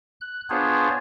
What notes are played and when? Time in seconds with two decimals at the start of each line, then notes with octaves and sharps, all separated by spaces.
0.21 F#6
0.50 B3 D4 F4 G#4 C5 C#5